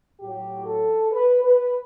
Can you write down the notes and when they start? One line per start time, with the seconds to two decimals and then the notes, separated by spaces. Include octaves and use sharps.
0.21 A2 F#3 G4
0.66 A4
1.12 B4
1.42 B4